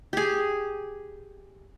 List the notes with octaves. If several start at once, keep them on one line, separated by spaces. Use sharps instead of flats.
G4 G#4